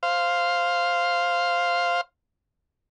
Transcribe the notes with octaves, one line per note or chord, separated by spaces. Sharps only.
C5 F5